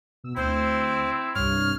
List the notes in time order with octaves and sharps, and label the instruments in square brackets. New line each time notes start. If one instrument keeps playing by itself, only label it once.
[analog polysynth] B2 E6
[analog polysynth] D2 [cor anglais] C4 [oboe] E4 [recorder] C5
[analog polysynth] C2 G2 [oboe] C#5 [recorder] F6